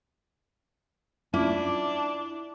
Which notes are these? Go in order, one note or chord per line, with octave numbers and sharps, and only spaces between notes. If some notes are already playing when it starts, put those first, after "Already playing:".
C#4 D4 E4 F4 E5 D6